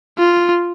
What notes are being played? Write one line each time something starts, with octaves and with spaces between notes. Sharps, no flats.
F4